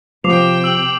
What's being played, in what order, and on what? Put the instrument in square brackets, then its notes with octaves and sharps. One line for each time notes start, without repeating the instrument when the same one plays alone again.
[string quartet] C3 G5 [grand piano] F3 [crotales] D6 C7 F7
[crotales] E6 F#7